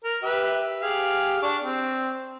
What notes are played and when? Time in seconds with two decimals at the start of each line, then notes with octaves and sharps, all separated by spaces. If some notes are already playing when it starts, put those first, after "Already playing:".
0.04 A#4
0.23 G4 B4 E5
0.82 G4 G#4 F5
1.42 D4 C#6
1.64 C4